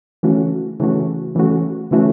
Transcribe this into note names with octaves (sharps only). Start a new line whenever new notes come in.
C#3 E3 A3 C#4 F#4
C#3 E3 A3 C#4 F#4
C#3 E3 A3 C#4 F#4
C#3 E3 A3 C#4 F#4